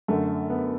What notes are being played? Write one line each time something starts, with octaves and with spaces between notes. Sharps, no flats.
F#2 D3 A3
B3